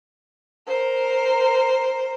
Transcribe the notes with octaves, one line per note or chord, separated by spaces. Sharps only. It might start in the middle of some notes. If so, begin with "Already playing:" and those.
A#4 C5